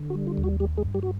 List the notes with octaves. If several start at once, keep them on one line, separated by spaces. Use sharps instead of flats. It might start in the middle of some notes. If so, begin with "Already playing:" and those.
Already playing: D3
F#4
G3
F4
D#2
F#4
G3 G4
G#3 G#4
G2
G3 G4
F#4